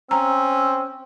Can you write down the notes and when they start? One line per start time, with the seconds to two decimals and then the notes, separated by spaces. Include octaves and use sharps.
0.11 C4 C#4 A#5 E6